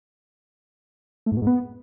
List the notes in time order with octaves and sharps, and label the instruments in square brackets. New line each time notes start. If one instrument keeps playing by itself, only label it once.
[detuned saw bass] A3
G#2
B2
G#2
B3